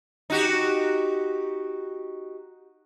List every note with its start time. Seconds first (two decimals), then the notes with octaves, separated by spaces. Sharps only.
0.30 D#4 F#4 G4